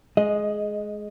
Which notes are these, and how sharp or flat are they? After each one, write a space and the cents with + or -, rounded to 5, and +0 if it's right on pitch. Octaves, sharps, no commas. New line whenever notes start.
G#3 +15 D#5 +0